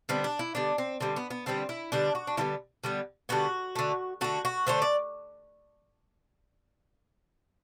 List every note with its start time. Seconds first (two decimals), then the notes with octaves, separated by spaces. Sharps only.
0.09 D3 G3 B3 C4
0.24 D4
0.39 E4
0.55 D3 G3 B3 D4
0.78 C4
1.00 D3 G3 B3 C4
1.16 B3
1.30 B3
1.46 D3 G3 B3 C4
1.69 E4
1.92 D3 G3 B3 D4
2.15 F#4
2.27 D4
2.37 D3 G3 B3 E4
2.84 D3 G3 B3
3.29 D3 G3 B3 F#4
3.75 D3 A3
4.21 D3 A3 F#4
4.45 F#4
4.67 D3 A3 C5
4.82 D5